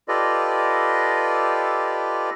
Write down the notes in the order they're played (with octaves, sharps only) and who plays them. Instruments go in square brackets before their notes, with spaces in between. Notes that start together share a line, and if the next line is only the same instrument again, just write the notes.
[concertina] F4 G4 A4 B4 D5 D#5